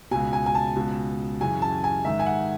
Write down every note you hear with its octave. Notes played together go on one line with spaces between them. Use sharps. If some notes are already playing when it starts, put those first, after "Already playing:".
C#2 B2 G#5
G#5
G#5
A5
C#2 B2
F#2 C#3 E3 G#5
A5
G#5
G#2 D#3 E5
G#5
F#5